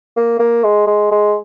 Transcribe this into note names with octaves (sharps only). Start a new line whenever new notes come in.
A#3
A#3
G#3
G#3
G#3